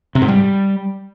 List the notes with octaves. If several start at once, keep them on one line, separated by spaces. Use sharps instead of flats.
C3
G#2
G3